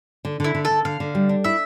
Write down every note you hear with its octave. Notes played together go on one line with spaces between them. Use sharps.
D3
D3 E4
D3
A4
D3
D3 F5
D3
G3
D4
E4 E5